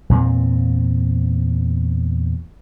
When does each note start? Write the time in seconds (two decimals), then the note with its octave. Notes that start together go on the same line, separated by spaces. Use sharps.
0.09 E2 A#2 C4